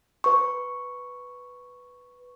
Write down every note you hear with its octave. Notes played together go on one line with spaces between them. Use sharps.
B4 C#6